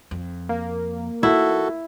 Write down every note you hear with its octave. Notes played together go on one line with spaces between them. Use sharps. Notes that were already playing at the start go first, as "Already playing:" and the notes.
F2
A#3
E3 D#4 E4 F#4 A4